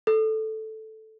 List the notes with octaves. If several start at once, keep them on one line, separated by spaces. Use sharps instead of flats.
A4